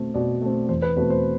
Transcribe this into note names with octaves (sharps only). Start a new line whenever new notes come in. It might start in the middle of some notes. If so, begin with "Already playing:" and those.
Already playing: B2 A3 C4
B2 D5
A3 C4
E2 C5
B4
B2 A3 C4 B4
C5